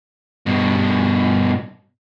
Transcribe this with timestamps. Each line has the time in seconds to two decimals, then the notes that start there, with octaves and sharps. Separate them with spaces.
0.46 G2 B2